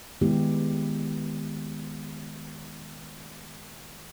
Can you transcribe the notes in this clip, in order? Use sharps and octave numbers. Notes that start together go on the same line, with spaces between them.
D#3 G#3 B3 E4 G4